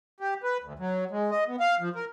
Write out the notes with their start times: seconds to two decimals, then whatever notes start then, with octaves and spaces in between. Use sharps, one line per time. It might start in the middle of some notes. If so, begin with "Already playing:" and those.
0.20 G4
0.43 B4
0.64 D2
0.79 F#3
1.11 G#3
1.31 D#5
1.48 B3
1.60 F5
1.80 F3
1.96 A#4